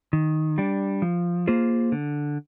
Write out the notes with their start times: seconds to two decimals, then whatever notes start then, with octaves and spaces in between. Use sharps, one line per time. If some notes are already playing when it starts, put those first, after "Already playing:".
0.13 D#3
0.58 G3 D4
1.02 F3
1.47 A#3 F4 G#4 C5
1.92 D3